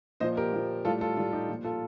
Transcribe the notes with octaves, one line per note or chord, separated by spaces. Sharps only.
A#2 F3 C5 D#5
G4 A#4
A#2 F3
A2 G3 F4 A4
F4 A4
A2 G3 F4
D#4 G4
A#2 F3
F4 A4